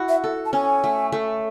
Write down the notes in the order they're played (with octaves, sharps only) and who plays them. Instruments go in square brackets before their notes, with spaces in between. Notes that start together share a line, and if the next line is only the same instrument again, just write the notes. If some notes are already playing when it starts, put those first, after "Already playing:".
Already playing: [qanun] E4 F#4
[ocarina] E5
[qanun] A4
[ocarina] A5
[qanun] C#4 [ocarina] G#5
[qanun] A3
A3